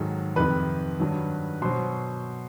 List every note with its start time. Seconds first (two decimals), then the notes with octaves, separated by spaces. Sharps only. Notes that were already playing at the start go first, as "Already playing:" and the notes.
Already playing: G#2 D#3 F#3 A4
0.36 F2 C3 D#3 B4 B5
1.00 G2 D#3 F#3
1.62 B2 F#3 C5 C6